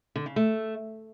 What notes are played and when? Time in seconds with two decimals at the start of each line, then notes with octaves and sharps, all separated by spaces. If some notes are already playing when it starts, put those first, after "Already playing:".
0.16 D3
0.26 C#3
0.36 A3